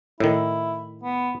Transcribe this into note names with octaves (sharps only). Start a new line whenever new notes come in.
A2 D#3 E4
B3